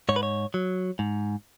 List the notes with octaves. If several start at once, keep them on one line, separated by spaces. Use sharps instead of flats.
G#2 C#5
B4
C#5
F#3
G#2